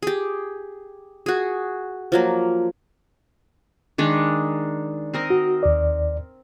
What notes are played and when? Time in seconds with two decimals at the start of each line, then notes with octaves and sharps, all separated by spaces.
0.02 G4 G#4
1.26 F#4 G#4
2.12 F3 F#3 A#3
3.98 D#3 G#3 D4
5.14 C4 A#4 D#5
5.30 F#4
5.63 D#2 D5